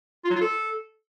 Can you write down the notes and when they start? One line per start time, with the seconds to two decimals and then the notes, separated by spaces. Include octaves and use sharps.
0.25 F4
0.30 F#3
0.36 F4
0.41 A4